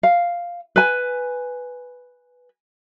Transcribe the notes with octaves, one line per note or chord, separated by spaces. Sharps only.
F5
B4 G#5